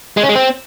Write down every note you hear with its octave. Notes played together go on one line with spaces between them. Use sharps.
G#3
C#4
G#3
C4